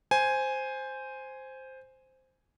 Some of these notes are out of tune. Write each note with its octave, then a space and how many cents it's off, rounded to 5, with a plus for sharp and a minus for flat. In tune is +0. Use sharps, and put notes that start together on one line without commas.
C5 +0 G#5 +0